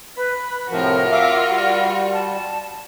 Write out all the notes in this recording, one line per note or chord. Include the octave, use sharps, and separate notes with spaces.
B4 B5
A2 C3 F3 F4 F#4 A#4
E5 F5 D6
G3
A5